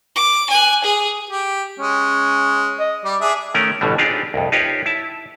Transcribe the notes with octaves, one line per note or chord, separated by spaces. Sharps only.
D6
G#5 F#6
G#4
G4
G#3 C#4
D#5
G3 D5
D4 G#4 E5
D#3 A3 C#4 A#4
A1 B2 D3 G3
C4 D4 D#4 F4 G4 G#4
C2 F2
D#4 F4 G4 B4 C#5
E4 A5